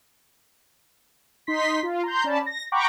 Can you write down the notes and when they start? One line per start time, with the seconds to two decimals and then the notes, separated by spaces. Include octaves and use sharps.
1.47 D#4 C6 B6
1.83 F4
2.03 A#5 C6 G6
2.24 C#4 D5 A5 B5
2.46 A#6
2.72 F#5 G5 A#5 B5 C#6 D6